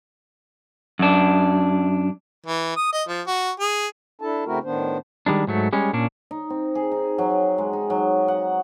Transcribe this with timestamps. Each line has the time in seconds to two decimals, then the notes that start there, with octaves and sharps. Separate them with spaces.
0.99 F#2 D4
2.46 E3
2.77 D#6
2.93 D#5
3.09 F3
3.27 F#4
3.60 G#4
4.22 D4 E4 A4 A5
4.46 C#3 A3 C4 E4 F#4 A#4
4.64 A2 D#3 B3 D4 C5
5.26 D#3 G3 G#3 D4
5.47 G#2 F#3 A3
5.73 G3 G#3 C#4
5.93 A#2 C#4 D4
6.31 D#4
6.50 C4
6.75 G#4
6.92 D#4
7.18 F#3
7.58 G#3
7.73 D#4
7.90 F#3
8.28 F#5